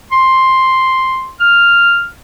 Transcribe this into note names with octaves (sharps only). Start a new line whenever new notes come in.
C6
F6